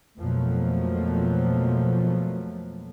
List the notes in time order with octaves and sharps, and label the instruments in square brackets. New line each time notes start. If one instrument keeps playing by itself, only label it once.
[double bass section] F2 B2 F3 F#3 A3 A#3